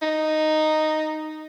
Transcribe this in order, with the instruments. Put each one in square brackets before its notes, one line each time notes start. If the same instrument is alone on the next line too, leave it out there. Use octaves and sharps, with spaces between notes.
[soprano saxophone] D#4